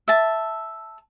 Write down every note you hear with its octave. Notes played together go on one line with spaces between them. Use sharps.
E5 A5